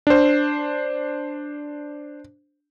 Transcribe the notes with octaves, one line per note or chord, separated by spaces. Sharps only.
D4 C5